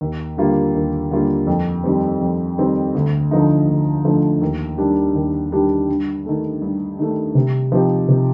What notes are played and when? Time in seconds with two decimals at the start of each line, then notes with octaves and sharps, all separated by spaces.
0.01 D#2
0.37 D3 G3 A#3 F4
0.75 D#2
1.10 D3 G3 A#3 F4
1.47 F2
1.84 D#3 G3 C4
2.21 F2
2.58 D#3 G3 C4
2.95 D2
3.31 D3 F3 A3 D#4
3.68 D2
4.04 D3 F3 A3 D#4
4.42 D#2
4.78 D#3 G3 D4 G4
5.15 D#2
5.52 D#3 G3 D4 G4
5.89 G2
6.26 D#3 A3
6.62 G2
6.99 D#3 A3
7.35 C3
7.72 F3 C4 D#4 G4
8.08 C3